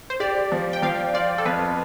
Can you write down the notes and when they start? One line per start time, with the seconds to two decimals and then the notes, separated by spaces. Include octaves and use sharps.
0.10 C5
0.20 G4 D5
0.52 F3
0.73 G5
0.83 F3 F5
1.14 F4 D5
1.38 A4
1.45 F2 B4